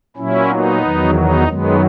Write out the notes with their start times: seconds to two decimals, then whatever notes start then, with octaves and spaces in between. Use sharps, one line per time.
0.17 A#2 F#3 C#4 E4
0.49 B3 D#4
0.82 E2 D#3 F#3
1.14 B3 D#4
1.47 F#2 D#3 F#3 G#3 B3